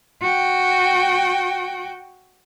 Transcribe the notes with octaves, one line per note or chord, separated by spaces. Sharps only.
F#4 G5